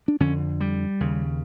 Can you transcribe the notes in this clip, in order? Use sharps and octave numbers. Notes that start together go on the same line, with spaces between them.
D4
F2 D3 C#4
G3
D#2 C#3